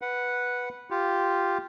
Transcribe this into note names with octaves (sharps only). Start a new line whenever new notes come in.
B4 F#5
F4 G4